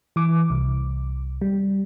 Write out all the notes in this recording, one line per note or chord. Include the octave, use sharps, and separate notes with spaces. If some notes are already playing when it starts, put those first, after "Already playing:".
E3 D6
C2
G3